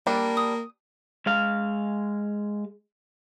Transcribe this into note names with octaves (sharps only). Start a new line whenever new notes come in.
G3 A#3 D4
D#6
G#3 F5